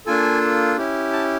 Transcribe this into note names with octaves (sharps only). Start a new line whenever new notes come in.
A#3 D4 F4 A4 G#5
C#4 E4 G4
A5